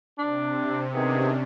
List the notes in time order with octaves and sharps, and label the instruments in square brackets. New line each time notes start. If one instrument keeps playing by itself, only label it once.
[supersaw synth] C3 [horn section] D4
[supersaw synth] C3 C#4 D4 [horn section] D#3 B3 G#4